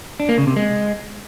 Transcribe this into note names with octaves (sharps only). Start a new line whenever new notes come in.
D4
A#3
C#3
C3
G#3